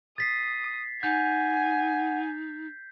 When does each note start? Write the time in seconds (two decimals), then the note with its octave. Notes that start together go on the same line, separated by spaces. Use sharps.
0.18 D#6 A6 B6 C7
1.03 D#4 F#5 G#5 G6